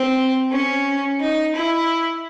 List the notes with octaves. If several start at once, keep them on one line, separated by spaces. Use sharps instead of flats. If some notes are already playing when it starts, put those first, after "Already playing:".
Already playing: C4
C#4
D#4
E4